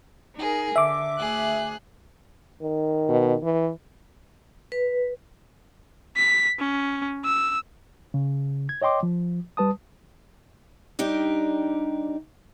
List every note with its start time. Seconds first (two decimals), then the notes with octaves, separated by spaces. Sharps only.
0.36 D#4 G#4 A#4
0.76 D3 E5 D6
1.19 D2 G#4 F#6
2.62 D#3
3.09 B2
3.43 E3
4.72 B4
6.17 B6
6.59 C#4
7.25 E6
8.14 C#3
8.69 G#6
8.82 C#5 D#5 G5 C6 D6
9.03 F3
9.57 G3 B4 A5 D#6
10.99 G3 D4 D#4 G4